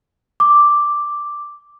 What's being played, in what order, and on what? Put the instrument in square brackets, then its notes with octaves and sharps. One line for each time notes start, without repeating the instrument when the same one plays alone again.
[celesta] D6